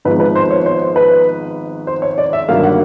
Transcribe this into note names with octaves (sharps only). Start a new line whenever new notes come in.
G#1 G#2 F3 G#3 B3 B4
B4
C5
C#5
C5
B4
C5
C#5
D5
E5
G1 G2 D#3 F#3 A#3 F5
F#5